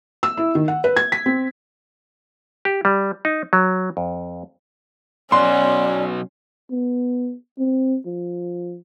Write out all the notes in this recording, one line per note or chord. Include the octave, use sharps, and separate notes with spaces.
E6
E4
D#3
F#5
B4
G#6
B6
C4
G4
G3
D#4
F#3
F2
B2 F#3 C#4 F#4 D5 C6
B3
C4
F3